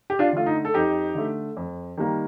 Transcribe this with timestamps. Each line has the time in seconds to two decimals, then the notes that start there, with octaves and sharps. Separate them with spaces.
0.10 G4
0.19 D4 F4
0.33 D3 A3 F4
0.46 D#4
0.65 A4
0.74 F2 D#4 G4
1.15 D3 A3
1.57 F2
1.98 D#3 G3 A#3